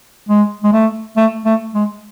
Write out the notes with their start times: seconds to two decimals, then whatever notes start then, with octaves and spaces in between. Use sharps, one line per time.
0.29 G#3
0.64 G#3
0.73 A3
1.17 A3
1.46 A3
1.75 G#3